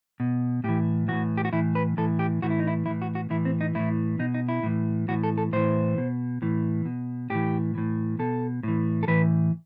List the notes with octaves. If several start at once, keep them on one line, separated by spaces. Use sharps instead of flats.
B2
A2 E3 G4
A2 E3 F#4
G4
F#4
A2 E3 E4
B4
A2 E3 A4
G4
A2 E3 F#4
E4
D#4
E4
A2 E3 E4
F#4
F#4
A2 E3 E4
C4
D#4
A2 E3 E4
B2 D#4
D#4
E4
A2 E3
A2 E3 F#4
A4
A4
A2 E3 C5
B2
A2 E3
B2
A2 E3 G4
A2 E3
B2 A4
A2 E3
A4
A2 E3 B4